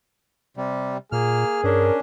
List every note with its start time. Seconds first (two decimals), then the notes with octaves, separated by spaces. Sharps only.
0.57 C3 G3
1.12 A#2 A#3 G#4 F6
1.64 G2 C#4 D4 A#4